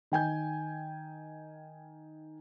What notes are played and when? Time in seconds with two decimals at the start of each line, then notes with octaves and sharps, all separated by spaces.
0.12 D#3 G5 G#5 G6